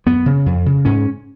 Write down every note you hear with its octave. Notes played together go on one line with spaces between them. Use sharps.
F#2 B3
C#3
F2
C#3
G#2 C#4